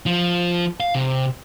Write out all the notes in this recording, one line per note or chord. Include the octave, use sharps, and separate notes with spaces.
F3
F5
C3